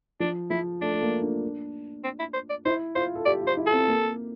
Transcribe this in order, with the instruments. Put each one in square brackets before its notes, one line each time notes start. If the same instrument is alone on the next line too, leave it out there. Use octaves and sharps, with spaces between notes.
[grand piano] F3 [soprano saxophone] D4
[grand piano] F3 [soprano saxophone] E4
[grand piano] A3 [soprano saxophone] D4
[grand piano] A3
A#3
D4
[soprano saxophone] C4
E4
C5
D5
[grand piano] E4 [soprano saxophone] C5
[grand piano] F4 [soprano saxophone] C5
[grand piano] A4
[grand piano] G4 [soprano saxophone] D5
[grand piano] F4
[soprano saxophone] C5
[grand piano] E4
[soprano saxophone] A4
[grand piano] C4
A#3